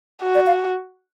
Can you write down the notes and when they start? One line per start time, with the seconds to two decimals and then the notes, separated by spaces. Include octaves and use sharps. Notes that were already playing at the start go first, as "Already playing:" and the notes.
0.23 F#4
0.35 D5
0.47 F5